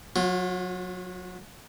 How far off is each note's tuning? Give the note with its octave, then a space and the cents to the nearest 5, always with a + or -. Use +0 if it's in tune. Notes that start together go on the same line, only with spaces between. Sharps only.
F#3 -25 F4 +25